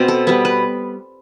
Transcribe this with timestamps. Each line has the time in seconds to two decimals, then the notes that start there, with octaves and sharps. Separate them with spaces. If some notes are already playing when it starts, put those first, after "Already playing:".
Already playing: B2 C4
0.08 A4
0.27 G3 B3 B4
0.45 B4